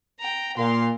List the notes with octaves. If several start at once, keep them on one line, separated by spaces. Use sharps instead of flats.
G5 A#5
A#2 A#4 F5 C6